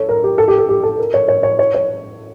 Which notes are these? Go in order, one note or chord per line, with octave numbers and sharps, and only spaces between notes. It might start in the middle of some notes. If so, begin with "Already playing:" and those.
Already playing: A4 C#5
A#4
G4
A4
G4
A4
G4
A4
A#4
C#5
C#5
C#5
C#5
C#5